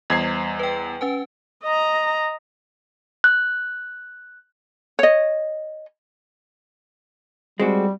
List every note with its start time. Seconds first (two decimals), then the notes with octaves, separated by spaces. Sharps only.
0.10 E2 G3 D#5 G#6 C7
0.59 B4 G5
1.01 C#4 B4 G#5
1.63 D#5 A#5
3.24 F#6
4.99 C#5 D#5
7.60 G3 G#3 C4 F#4